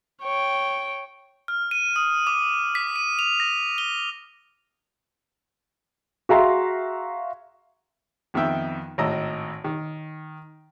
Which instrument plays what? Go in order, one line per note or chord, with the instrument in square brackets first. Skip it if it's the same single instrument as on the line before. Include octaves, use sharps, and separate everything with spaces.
[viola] C#5 G5
[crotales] F6
D#7
D#6
D6
B6
D#7
F7
A#6
G7
[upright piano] F#4 G#4 E5 F5 A#5 C6
[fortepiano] F2 D#3 B3 E5 G5
G#1 A2 D#5 A#5 E6
D#3